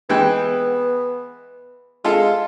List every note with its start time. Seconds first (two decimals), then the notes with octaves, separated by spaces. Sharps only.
0.09 E3 G#3 B3 G5
2.04 G#3 F4 A4